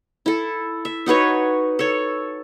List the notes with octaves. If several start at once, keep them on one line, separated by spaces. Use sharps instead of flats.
E4 A4
E5
D#4 F#4 B4 C#5
A4 C#5